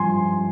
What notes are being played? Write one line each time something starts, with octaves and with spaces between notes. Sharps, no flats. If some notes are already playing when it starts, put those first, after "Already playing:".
Already playing: G2 F3 G#5 C6